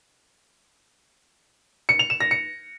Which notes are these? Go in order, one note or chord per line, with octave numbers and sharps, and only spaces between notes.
C#7
F7
E7
A#6
C#7